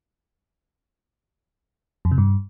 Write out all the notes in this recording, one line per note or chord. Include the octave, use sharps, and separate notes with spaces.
F2
C3
G2